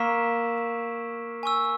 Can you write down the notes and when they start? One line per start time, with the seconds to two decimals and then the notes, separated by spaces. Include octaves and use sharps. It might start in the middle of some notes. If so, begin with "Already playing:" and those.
Already playing: A#3 C#6 E6 B6 E7
1.43 G#5 C#6 E6